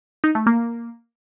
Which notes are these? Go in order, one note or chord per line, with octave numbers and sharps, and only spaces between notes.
D#4
A3
A#3